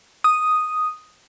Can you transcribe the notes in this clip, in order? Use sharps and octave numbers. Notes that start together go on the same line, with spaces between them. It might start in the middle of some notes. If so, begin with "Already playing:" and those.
D#6